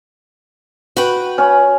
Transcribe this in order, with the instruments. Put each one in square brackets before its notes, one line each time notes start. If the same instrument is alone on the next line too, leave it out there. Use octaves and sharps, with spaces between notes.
[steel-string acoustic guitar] F#4 B4 G5
[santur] C#4